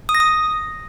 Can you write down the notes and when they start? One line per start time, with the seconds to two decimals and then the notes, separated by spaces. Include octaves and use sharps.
0.09 D#6
0.15 A#6
0.20 D#6